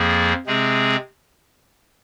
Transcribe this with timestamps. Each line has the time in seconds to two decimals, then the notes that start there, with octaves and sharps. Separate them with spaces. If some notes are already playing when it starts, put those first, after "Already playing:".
Already playing: F2 F3 A#3 G#4
0.46 C3 G#3 C4 G#4